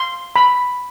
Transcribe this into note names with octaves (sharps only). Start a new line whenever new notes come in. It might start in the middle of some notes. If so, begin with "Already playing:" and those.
Already playing: C6
B5